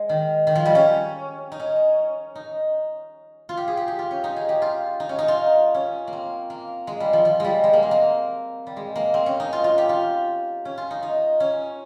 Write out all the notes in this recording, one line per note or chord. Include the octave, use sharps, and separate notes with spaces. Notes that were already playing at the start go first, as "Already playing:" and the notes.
Already playing: G#3
D#3
D#3
F3
G3
C#4
D#4
C#4
D#4
F4
G4
G#4
G4
G4
F4
C#4
D#4
G#4
G4
F4
D#4
C#4
D#4
F4
C#4
A#3
C4
A#3
G#3
G3
F3
F3
G3 G#3
G#3
A#3
C4
A#3
G3
G#3
A#3
C4
C#4
D#4
F4
F4
G4
F4
C#4
F4
D#4
D#4
C#4